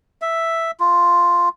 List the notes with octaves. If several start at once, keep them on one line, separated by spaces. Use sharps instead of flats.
E5
F4